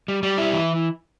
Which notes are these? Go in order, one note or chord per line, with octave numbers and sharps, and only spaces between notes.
G3
G3
E4
E3